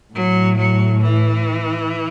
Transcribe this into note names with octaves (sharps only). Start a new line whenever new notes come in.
A2 F#3
F#3
E3